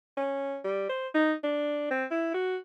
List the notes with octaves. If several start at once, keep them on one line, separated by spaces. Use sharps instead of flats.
C#4
G3
C5
D#4
D4
C4
E4
F#4